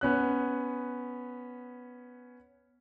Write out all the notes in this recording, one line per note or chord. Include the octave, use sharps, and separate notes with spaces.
B3 C#4 F#6